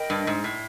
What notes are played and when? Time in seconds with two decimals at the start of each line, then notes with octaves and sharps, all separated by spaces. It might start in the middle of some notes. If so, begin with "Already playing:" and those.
Already playing: A#4 D#5 G5 B5
0.10 G2
0.27 G#2
0.44 A2